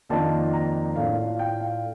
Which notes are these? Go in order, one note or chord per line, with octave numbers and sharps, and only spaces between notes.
F2 D#3 A#3 D4 F4 A5
A#5
A2 A3 D4 F4 F5
F5
G5
F5